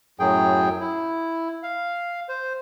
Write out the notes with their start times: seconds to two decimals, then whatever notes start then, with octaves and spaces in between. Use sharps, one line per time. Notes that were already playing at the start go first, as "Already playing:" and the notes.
0.20 F#2 A2 F#3 G#4 G5
0.81 E4
1.63 F5
2.29 C5